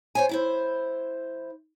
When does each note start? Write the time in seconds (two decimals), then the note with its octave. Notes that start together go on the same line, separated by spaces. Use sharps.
0.15 C5 C#5 G#5
0.29 E3 E4 C5